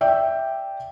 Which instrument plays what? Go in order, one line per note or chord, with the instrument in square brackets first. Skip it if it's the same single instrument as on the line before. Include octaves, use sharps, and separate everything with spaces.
[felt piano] D5 E5 G5